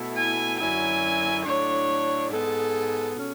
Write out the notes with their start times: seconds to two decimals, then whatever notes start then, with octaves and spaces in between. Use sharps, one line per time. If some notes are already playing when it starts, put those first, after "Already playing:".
Already playing: B2 A3 E4
0.17 G#5
0.59 F#2 D3 F#3 C#4 E4 G#5
1.45 A2 F#3 A3 D4 C#5
2.30 G#2 G#3 B3 A4
3.15 B2 G#3 C#4